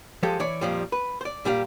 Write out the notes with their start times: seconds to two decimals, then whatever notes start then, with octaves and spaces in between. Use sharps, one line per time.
0.23 F3 G#3 G4 A4
0.40 E3 C#5 D5
0.61 F2 A#2 F3 G3
0.92 B4
1.21 C5 D5
1.45 A#2 G3 G4 F5